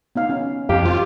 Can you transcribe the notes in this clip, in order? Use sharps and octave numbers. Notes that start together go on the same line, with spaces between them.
B3 D#4 F5
C#4
F2 G4 F5
F4 C5